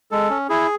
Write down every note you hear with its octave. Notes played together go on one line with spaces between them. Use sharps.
G#3 A4
C#4
E4 G#4